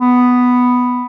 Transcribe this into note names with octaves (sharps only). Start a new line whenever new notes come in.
B3